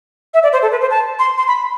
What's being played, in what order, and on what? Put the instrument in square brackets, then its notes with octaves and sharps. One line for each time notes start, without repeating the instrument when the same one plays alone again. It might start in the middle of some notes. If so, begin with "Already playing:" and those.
[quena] E5
D5
C5
A4
B4
C5
A5
C6
C6
B5